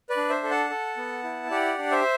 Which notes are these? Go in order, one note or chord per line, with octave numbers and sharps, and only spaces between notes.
B4 D5
D4
C5 E5
A4
F#5 A5
A4
B3
E4
G4 D5 F#5
D4
C5 E5